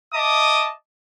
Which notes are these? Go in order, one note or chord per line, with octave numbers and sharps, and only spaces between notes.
D#5 E5 A5 D6 D#6